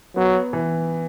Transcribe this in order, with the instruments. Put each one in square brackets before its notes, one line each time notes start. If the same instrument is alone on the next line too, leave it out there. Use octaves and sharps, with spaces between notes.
[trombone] F#3 [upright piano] B3
[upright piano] E3